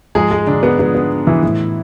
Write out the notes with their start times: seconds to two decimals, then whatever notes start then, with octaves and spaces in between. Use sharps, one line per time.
0.15 G#2 F3 G#3 G#4
0.31 G#3 G#4
0.47 D3 D4
0.63 B3
0.79 G#2 F3 B3
0.95 B3
1.27 E3 E4
1.43 A2 E3